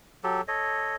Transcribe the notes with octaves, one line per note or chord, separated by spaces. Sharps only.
F#3 G4 A4
A4 C#5 D#5